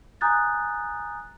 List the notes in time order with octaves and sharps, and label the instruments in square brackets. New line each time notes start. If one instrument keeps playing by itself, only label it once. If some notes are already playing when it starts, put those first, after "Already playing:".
[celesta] G#5 A#5 D#6 F#6 G6 A6